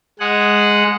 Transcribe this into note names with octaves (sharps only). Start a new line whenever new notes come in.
G#3 G#4 F#5